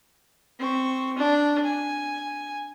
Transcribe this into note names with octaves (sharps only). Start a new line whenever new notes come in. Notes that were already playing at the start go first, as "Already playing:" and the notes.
C4 C#6
D4
G#5